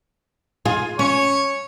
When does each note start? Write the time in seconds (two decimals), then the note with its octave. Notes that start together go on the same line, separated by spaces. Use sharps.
0.65 F4 G#4
0.99 C#4 C#5